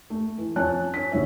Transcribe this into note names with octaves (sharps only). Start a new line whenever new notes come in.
A3
E3
F2 C#4 A5 F#6
C#4 B6
A#1 D3 F#3 C#5 E5